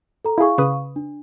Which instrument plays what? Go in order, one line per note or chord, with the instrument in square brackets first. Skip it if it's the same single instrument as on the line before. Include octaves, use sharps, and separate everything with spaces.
[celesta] A4 A#5
[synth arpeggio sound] E4 G#4 [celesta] F5 C#6
[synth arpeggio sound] C#3 B4 D#6
[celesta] D4